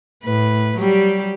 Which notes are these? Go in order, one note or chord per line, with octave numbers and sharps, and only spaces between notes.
A2 B4
F#3 G3 G4